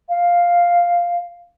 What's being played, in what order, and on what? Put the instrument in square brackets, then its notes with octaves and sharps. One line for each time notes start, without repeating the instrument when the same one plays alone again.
[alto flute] F5